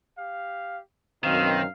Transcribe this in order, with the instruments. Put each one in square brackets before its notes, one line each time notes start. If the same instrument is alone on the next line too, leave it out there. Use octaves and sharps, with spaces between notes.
[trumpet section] G4 F5
[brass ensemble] F#2 B2 C4 [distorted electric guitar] D#3 [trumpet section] D#4 [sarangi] F5